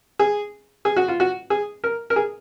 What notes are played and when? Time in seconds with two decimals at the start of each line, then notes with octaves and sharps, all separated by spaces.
0.19 G#4
0.85 G#4
0.96 F#4
1.08 F4
1.20 F#4
1.50 G#4
1.84 A#4
2.10 A#4
2.16 G#4